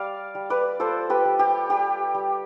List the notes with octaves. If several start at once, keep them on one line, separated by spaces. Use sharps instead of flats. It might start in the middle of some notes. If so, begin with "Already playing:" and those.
Already playing: G3 D5 F5
G3
B4 D5
F4 A4 C5
G4 B4
G3
G4
G3 G4
G3